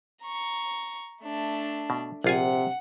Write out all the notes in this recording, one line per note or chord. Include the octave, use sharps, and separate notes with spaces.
A#5 C#6
A3 D4
B2
A#1 C3 F4 F#5 G#5